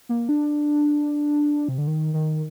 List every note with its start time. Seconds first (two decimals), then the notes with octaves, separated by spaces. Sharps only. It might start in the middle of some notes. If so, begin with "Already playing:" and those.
0.09 A#3
0.29 D4
1.68 C3
1.78 D3
1.87 D#3
2.14 D#3